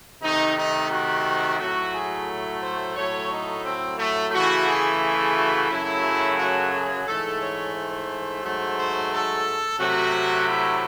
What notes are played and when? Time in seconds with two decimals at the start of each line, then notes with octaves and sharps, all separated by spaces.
0.22 C3 D#3 A3 D#4
0.56 D#4
0.90 F#4
1.59 A2 F#3 A3 F#4
1.93 G#4
2.62 C5
2.95 A2 F#3 A3 C#5
3.30 D#4
3.64 C4
3.98 A3
4.32 C#3 E3 A3 F#4
4.66 G#4
5.01 G#4
5.35 F#4
5.69 F#2 C#3 F#3 A3 E4
6.37 F#4
6.72 G#4
7.05 G#2 E3 A3 A4
7.40 C#5
7.74 C5
8.42 G#2 F#3 A3
8.76 C5
9.11 A4
9.78 C3 F#3 A3 F#4
10.48 E4